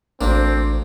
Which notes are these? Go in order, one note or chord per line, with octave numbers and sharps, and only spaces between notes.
A1 D2 A#3 C4 D4